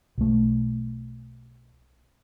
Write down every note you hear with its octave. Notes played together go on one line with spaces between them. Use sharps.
B1 A3